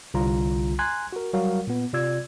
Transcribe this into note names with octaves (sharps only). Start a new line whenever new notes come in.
C2 D3 F4 A#5
G#5 A#5 C6 F#6 G#6
F#4 A#4
F#3 G3 F#4 A#4 F5
A#2 B3
C3 F4 D5 E6 G#6